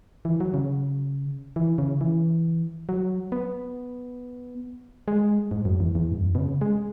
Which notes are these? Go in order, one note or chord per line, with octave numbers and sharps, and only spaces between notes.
E3
F#3
C#3
E3
C#3
E3
F#3
B3
G#3
G#2
F#2
E2
E2
G#2
F#2
B2
C#3
G#3